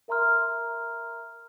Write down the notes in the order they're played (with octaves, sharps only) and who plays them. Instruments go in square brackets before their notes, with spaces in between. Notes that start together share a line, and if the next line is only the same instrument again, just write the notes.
[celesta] A#4 E5 A#5 C6 F6